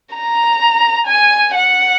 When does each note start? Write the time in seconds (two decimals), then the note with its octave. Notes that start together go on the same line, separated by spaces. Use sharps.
0.15 A#5
1.07 G#5
1.54 F#5